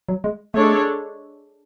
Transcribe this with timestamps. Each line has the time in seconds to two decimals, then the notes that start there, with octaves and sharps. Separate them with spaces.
0.09 F#3
0.24 G#3
0.54 G#3 A3 D4 A4 C#5